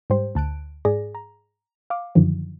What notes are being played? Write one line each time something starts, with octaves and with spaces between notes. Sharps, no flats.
G#2 G3 G4 C5
D2 A5 F#6 D7
G#2 G#4 D5 A#6
A#5
F5 D6
F#2 D3 D#3 F3